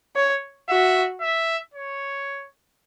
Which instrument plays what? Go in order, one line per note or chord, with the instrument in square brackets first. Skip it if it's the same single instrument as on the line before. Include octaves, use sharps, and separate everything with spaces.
[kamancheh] C#5
[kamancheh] F#4 [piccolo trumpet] E5
[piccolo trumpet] E5
C#5